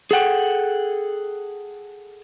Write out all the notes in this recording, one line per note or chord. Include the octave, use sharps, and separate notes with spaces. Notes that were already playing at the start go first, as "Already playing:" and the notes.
G#4 A4 F#5 G5